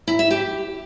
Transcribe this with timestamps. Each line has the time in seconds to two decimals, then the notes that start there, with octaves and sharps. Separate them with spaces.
0.07 E4
0.19 E5
0.30 G4